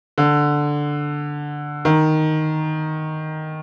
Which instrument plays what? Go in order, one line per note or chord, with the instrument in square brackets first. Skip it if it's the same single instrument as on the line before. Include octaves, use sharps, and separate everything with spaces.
[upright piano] D3
D#3